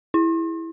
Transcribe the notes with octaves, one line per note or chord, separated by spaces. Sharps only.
E4